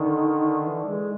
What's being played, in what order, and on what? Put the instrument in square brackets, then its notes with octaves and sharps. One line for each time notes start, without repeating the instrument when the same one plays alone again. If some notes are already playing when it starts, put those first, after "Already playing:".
Already playing: [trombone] D3 [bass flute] D#3
[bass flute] E3
G#3